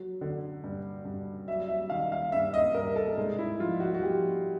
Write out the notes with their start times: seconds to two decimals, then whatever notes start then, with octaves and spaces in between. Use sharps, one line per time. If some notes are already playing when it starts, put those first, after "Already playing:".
Already playing: F#3
0.21 D3
0.64 G2
1.05 G2
1.48 F#3 E5
1.68 E5
1.90 D#3 F5
2.12 F5
2.32 G2 E5
2.54 D#5
2.74 G2 A#4
2.96 A4
3.17 G#2 G#4
3.39 E4
3.60 F3 F4
3.80 F#4
3.94 F#4
4.02 F3 G4